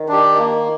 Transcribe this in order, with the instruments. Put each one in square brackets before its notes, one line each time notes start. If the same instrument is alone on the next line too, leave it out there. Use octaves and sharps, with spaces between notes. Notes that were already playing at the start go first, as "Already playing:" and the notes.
Already playing: [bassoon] D#3
[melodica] D4 G4
A#3